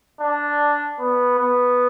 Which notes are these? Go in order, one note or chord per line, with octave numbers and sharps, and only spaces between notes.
D4
B3
B3